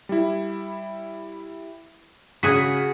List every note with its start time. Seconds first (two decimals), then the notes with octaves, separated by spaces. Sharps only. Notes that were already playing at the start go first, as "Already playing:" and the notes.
0.09 G3 E4
2.43 C#3 F#4 G#4 B6